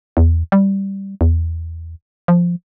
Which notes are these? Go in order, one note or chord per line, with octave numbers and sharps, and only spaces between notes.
E2
G3
E2
F3